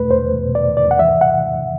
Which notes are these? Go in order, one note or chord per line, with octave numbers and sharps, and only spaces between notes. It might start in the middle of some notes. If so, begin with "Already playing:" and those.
Already playing: E2 B2 A3 B4
E2 C5
B2
D5
E2
D5
F#5
E3 E5
F#5